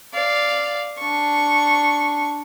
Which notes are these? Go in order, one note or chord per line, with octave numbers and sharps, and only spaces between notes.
D5 F5
D4 C#6